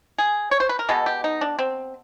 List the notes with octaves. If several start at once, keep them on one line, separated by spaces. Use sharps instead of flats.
G#4
C#5
C5
B4
A#4
B2 G#3 B3 A4
G4
D#4
D4
C4